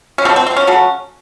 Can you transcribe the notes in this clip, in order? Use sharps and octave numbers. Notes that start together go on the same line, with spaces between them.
C#4
C#3 F#3 A3 C4
C4
C4
C#4
C#3 F#3 A3